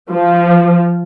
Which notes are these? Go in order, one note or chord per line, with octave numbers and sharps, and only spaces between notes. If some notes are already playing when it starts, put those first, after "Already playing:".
F3